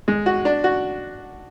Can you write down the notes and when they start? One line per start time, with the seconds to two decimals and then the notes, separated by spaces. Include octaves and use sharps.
0.08 G#3
0.26 F#4
0.45 D4
0.64 F#4